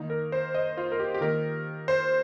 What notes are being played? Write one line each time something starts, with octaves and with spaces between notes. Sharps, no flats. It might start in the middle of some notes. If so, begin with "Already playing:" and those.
Already playing: D#3 A#3 D#4
A#4
C5
D#5
F4
A#4
G4
G4
D#3 A#3 D#4 A#4
C5